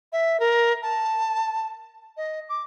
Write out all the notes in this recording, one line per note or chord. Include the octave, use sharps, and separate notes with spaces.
E5
A#4
A5
D#5
D6